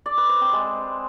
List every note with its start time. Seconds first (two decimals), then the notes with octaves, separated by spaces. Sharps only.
0.06 D5
0.17 B4
0.29 C5
0.41 C4
0.53 G#3